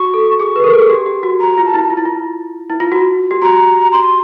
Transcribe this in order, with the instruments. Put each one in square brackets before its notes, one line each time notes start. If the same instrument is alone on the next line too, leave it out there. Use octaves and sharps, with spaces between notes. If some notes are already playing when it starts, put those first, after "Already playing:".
Already playing: [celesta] F#4 [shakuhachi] C#6
[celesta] A4
[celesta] G#4 [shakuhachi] D6
[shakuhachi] C#6
[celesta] B4
A#4
A4
G#4
G4
G4
F#4
[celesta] F#4 [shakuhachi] A#5
[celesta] F4
[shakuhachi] A5
[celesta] E4
F4
E4
F4
E4
F4
F#4
G4
[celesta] F#4 [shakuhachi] A#5
[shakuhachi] C6